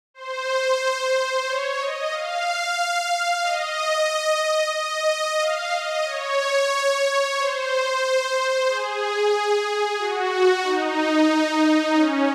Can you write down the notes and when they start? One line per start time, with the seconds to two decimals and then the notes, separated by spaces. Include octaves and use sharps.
0.14 C5
1.46 C#5
1.79 D#5
2.12 F5
3.42 D#5
4.74 D#5
5.39 F5
5.72 D#5
6.05 C#5
7.36 C5
8.67 G#4
9.99 F#4
10.63 D#4
11.94 C#4